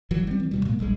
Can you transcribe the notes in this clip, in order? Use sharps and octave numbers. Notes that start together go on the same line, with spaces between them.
G1 E3 F#3
G3 C4
E3
D#2 B2 G3
A2 G#3 A#3
D#1 A#1 G3 G#3